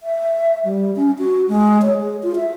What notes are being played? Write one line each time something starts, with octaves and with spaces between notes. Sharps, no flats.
E5
G3
C#4
F#4
G#3
C#5
G#4
F4
E5